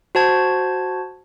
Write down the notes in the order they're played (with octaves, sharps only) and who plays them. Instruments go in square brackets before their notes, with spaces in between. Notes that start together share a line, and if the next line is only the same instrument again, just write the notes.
[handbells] F#4 C5 A5 G#6